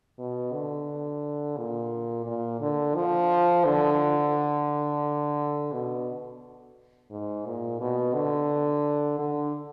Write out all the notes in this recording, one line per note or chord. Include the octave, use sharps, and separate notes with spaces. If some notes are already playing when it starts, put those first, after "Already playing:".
B2
D3
A#2
A#2
D3
F3
D3
B2
G#2
A#2
B2
D3
D3